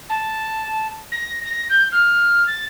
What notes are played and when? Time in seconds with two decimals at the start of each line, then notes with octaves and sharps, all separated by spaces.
0.09 A5
1.12 A#6
1.45 A#6
1.69 G6
1.92 F6
2.47 A6